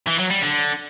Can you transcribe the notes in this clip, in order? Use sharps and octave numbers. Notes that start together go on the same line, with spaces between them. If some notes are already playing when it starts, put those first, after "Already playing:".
E3
F#3
G3
D3